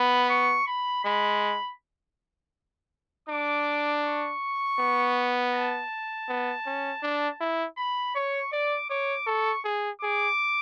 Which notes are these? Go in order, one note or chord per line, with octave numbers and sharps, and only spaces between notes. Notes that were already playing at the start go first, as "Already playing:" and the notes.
Already playing: B3 B5
C#6
B5
G#3 B5
D4 D6
C#6
B3
A5
B3
C#4
D4
E4
B5
C#5 C#6
D5 D6
C#5 D6
A4 C#6
G#4
G#4 D6